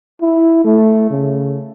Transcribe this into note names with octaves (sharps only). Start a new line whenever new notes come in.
E4
A3
C#3